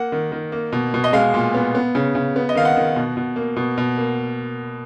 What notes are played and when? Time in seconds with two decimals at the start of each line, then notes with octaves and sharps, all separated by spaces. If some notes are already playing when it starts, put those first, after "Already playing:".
Already playing: A#3 F#5
0.12 D#3
0.32 D#3
0.52 A#3
0.72 B2
0.94 B2
1.04 D#5
1.13 G#3 F5
1.34 A#2
1.54 B3
1.75 B3
1.95 C#3
2.15 C#3
2.36 B3
2.49 D#5
2.55 D#3 F5
2.65 F#5
2.76 D#3
2.96 B2
3.17 B2
3.36 A#3
3.56 B2
3.78 B2
3.97 A#3